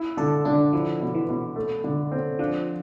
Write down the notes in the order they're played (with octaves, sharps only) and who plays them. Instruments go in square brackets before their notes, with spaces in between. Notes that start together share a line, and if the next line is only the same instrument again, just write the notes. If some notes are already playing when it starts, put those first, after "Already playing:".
Already playing: [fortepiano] E4
[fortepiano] D3 [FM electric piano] A4
[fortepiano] D3 [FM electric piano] D4
[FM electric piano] F3 [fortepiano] E4
[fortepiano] B2
[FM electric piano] E3
[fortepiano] B2
A3
D3
C4
[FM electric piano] F3 [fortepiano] D4